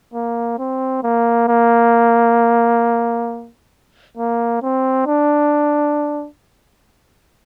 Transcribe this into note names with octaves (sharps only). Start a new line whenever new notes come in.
A#3
C4
A#3
A#3
A#3
C4
D4